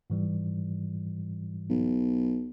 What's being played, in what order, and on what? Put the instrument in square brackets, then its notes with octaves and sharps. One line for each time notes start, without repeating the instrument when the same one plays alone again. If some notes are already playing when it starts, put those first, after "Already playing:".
[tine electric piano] G#2 E3 G3
[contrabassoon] B1